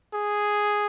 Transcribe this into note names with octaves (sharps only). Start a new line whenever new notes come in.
G#4